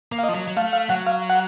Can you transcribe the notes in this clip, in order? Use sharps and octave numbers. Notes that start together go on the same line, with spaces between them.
A#3
F5
D#5
F3
F#3
F#3
A3 F5
F5
F#3 F#5
F5
F#5